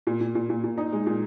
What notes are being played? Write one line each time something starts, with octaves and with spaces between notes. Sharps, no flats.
A#2
A#2
A#2
A#2
A#2
D#4
G#3
A#2